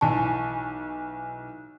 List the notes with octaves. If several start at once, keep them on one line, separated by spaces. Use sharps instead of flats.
B1 E3 G#5 A5 C#6